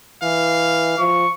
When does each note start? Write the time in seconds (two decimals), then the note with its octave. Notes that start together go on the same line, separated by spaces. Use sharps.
0.23 E3 F5
0.99 F3 C#6